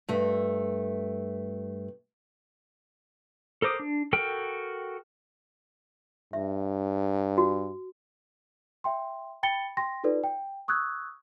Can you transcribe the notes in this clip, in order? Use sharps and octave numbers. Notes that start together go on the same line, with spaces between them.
G2 A3
A4 A#4 C5 D6 D#6
D4
F#4 A4 A#4 G5 F6
G2 E5
F#4
E5 G5 C6
G5 B5 A6 C#7 G7
G5 C6 A#6
D#4 F4 A4 B4 D5
G5
C#6 D#6 E6 F#6 G#6